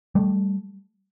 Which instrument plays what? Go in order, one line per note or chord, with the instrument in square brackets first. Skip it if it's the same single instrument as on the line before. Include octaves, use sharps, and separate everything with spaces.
[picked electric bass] G3 A3